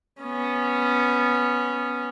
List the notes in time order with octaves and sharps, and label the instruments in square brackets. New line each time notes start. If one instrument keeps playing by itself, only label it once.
[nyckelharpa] B3 C#4